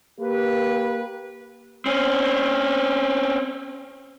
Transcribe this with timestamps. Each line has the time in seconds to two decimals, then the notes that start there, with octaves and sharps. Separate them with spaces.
0.21 A#3 G4 B4
1.86 C4 C#4